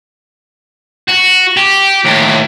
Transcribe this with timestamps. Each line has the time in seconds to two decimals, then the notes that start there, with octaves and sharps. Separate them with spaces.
1.08 F#4
1.57 G4
2.04 D#2 A2